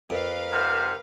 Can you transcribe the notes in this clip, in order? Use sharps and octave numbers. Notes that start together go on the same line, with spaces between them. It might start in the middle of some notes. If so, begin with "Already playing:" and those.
F2 A#4 B4 F5
G#2 C3 F6